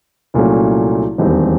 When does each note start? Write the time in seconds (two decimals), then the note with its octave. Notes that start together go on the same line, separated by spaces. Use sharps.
0.34 C2 A#2 F#3 A3 C#4
1.18 E1 D#2 D#3 G3 C4